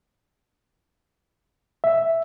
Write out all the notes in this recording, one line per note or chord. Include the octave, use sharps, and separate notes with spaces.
E5